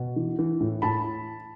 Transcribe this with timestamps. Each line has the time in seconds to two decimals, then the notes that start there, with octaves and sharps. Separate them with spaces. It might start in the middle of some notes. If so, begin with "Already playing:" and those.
Already playing: B2
0.16 E3
0.39 E3
0.60 A2
0.82 A2 A5 B5